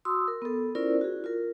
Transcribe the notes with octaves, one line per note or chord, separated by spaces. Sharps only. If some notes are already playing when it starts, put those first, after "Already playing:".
F#4 C6 D#6 E6
A#4
B3 A4
C#4 E4 F4 A#4 C5 D5
F#4 G#4
F4 A#4